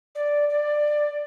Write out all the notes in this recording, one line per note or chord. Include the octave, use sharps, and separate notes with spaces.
D5
D5